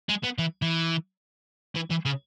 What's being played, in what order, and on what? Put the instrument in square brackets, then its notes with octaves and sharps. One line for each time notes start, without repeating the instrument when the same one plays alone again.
[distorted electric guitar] G#3
B3
E3
E3
E3
E3
C#3